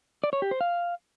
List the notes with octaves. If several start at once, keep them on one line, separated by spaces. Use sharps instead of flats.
D5
C#5
G4
C5
F5